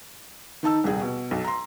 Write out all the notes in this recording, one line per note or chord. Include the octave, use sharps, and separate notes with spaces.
D#3 D#4 A5 E6
D#1 C2 G#4 G5
B2
B1
A#5 C6